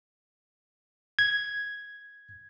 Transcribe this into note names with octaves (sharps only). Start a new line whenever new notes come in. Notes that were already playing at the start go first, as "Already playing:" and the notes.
G#6